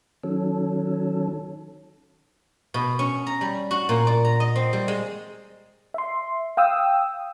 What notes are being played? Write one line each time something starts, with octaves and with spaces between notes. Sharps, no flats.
D#3 F#3 C#4 A4
B2
C#4
A#5
G3
F#4
A#2
D5
A#5
D#5
C4
G3
G#3
E5 C6
F5 G5 D#6 E6